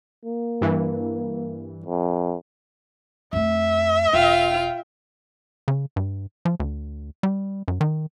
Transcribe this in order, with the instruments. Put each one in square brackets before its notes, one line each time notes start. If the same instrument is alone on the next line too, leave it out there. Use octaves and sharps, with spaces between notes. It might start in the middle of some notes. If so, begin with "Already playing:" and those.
[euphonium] A#3
[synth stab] G2 E3
[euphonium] F2
[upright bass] F2 A3 [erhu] E5
[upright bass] E1 [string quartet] F4 G5 F6
[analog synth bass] C#3
G2
F3
D2
G3
F#2
D#3